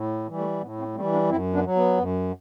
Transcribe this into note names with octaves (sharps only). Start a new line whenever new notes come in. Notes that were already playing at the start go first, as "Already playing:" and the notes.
Already playing: A2
E3 G3
A3
A2 B3
A3 C4
E3 G3 A3 C4
B3 D4
F#2 C4 E4
B3 D4
F#3
B3
F#2